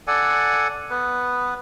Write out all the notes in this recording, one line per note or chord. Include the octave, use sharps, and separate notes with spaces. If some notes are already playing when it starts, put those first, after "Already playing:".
A4 D5 F#5 G#5
B3 B4